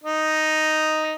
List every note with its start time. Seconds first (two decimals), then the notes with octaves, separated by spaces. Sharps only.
0.04 D#4 D#5